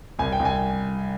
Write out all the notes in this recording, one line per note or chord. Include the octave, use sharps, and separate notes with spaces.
C2 G#5
G5
C2
G#5